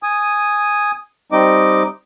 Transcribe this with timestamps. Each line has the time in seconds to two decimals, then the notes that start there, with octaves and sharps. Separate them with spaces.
0.03 G#5 D#6
1.32 G3 C4 D#4 D#5 D6